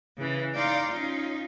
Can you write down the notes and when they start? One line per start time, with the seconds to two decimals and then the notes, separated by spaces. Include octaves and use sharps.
0.16 C#3 E3
0.53 D#4 D5 F5 G5 A#5 C6
0.90 C#4 D#4 F4